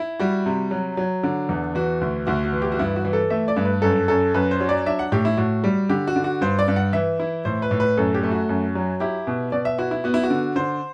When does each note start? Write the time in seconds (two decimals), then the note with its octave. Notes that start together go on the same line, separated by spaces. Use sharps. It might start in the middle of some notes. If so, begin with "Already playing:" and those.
Already playing: E4
0.20 G3 F#4
0.46 C3
0.71 F#3
0.97 F#3
1.23 D3
1.49 E2
1.75 E3 F#4
2.01 D2
2.27 D2 F#4
2.44 F#4
2.53 E3
2.62 G4
2.72 F#4
2.79 G2 E4
2.96 F#4
3.05 E3
3.13 A4
3.30 A3 E5
3.48 D5
3.56 G2
3.65 B4
3.82 F#2 A4
4.08 F#2 A4
4.34 F#2 B4
4.51 C5
4.60 F#3
4.69 D5
4.86 D4 E5
4.99 F#5
5.12 A2 G4
5.25 E4
5.37 A2 F#4
5.64 G3
5.89 D3 G4
6.07 F#4
6.16 D3
6.24 F#4
6.41 G2 C5
6.59 D5
6.68 G2
6.76 F#5
6.93 E3 E5
7.20 E4
7.45 A2 C5
7.62 B4
7.71 A2
7.80 B4
7.97 F#2 A4
8.14 G4
8.23 A3
8.31 F#4
8.49 F#2
8.75 F#3
9.00 E4 G4
9.27 B2
9.52 B2 D5
9.65 E5
9.78 E4 F#4
9.91 E4
10.04 B3 F#4
10.14 E4
10.23 F#4
10.30 D3
10.56 D3 C5